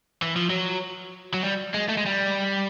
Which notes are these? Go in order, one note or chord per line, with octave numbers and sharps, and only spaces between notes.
E3
F3
F#3
F#3
G3
G#3
A3
G#3
G3